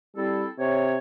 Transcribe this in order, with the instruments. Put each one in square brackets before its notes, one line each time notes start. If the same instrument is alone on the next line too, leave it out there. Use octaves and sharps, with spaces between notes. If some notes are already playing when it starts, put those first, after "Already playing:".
[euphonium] G3 [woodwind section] C4 E4 A4
[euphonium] C3 [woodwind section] C#5